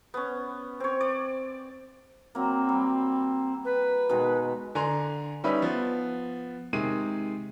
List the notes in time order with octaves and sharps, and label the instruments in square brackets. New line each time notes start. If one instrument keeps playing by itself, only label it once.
[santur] B3 C#4
C4 C#5
D5
[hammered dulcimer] F#3 A#3 [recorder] C4
[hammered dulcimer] G3
[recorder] B4
[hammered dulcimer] B2 D#3 G#3
[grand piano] D3 G#5 A#5 C6
G3 C#4 D#4 B4 E5
F3 B3
C3 D#3 G#3 G#4 D#7